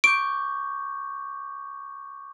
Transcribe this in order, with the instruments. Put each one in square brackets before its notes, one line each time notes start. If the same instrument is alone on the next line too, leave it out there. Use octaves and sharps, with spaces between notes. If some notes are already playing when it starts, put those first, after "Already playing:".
[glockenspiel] C#6 D6 G6 [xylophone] D7